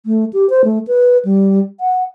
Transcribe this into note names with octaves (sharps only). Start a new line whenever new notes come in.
A3
G4
C5
A3
B4
G3
F#5